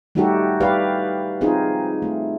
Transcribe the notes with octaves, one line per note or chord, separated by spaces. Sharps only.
G3 A3 D#4 F#4 G4 A4
G4 B4 D5 F5
C4 D#4 F4 G#4
A3